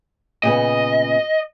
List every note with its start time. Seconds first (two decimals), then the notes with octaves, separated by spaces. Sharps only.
0.43 A#2 C#3 B3 D#5